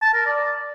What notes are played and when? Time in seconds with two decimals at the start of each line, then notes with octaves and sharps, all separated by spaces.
0.02 A5
0.14 A#4
0.26 D5